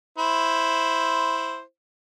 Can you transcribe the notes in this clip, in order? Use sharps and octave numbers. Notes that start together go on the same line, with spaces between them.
E4 C5